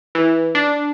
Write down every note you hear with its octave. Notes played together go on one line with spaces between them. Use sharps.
E3
D4